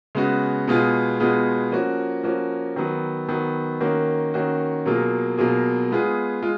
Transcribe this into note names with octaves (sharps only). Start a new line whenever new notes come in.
C#3 G#3 B3 F#4
B2 G#3 B3 F4 G#4
B2 G#3 B3 F4 G#4
F3 A#3 C#4 F#4
F3 A#3 C#4 F#4
D#3 F#3 B3
D#3 F#3 B3
D#3 A#3 C#4 F#4
D#3 A#3 C#4 F#4
B2 F#3 A#3 F4 G#4
B2 F#3 A#3 F4 G#4
G#3 B3 F4 G#4
G#3 F4